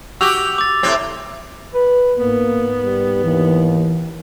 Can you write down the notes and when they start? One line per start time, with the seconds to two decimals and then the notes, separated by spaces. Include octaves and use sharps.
0.21 F#4 G4 E6 F7
0.58 D6 A6
0.83 A2 C3 C4
1.74 B4
2.18 G#2 A#3 B3
2.83 G3
3.25 D#2 E3